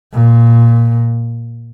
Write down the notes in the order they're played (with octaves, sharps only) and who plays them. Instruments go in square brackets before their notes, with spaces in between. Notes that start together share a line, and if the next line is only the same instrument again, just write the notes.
[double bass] A#2